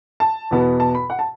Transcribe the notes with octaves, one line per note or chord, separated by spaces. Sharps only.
A5
E2 B2 B3
A5
B5
F#5
A5